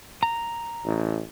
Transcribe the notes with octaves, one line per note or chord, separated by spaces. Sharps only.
A#5
A1